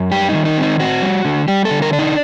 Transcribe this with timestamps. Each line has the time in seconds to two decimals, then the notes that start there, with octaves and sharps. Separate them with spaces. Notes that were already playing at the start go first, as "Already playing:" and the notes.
Already playing: F#2
0.11 G3 G4
0.29 D#4
0.34 D#3
0.45 D#4
0.57 C4
0.62 D#4
0.80 C4 F#4
1.02 G3
1.25 D3
1.48 G3 G4
1.65 A4
1.71 D3
1.82 A#4
1.93 D4
1.99 D#4